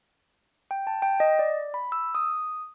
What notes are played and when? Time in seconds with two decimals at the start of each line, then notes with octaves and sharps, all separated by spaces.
0.71 G5
0.87 A5
1.02 G5
1.20 D#5
1.39 D5
1.74 B5
1.92 E6
2.15 D#6